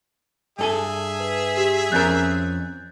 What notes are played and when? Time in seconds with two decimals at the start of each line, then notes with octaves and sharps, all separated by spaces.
0.59 G2 G#4 A4 E5 G#5
1.20 B4
1.57 G4
1.92 F2 C#4 A#4 F#6 G6 A6